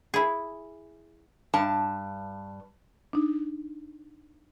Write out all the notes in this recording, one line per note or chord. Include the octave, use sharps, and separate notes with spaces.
E4 G#4
G2 A5
D4 D#4